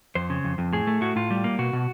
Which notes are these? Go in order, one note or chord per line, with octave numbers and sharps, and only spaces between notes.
F2 C5
C#3
F2
F2
A2 G#4
A3
A2 F#4
A2 F4
G3
A#3
B2 F#4
B2